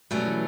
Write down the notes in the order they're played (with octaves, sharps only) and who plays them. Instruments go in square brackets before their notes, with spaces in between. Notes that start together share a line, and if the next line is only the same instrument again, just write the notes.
[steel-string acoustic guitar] B2 F#3 A3 C#4 [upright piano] G3
[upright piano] E3